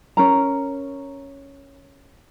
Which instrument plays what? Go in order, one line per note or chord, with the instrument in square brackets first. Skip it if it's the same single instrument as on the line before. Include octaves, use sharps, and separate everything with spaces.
[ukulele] C#4 A#4 A#5